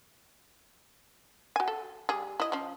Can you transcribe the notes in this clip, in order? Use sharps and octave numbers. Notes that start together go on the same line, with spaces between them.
F#4 G#5
A4
G3 G#4
E4 D#5
F3 C#4